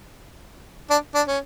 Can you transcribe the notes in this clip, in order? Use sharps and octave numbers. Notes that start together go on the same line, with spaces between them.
D4
D4
C#4